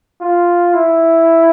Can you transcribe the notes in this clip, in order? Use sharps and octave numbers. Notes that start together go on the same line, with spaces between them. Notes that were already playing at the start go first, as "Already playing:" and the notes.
F4
E4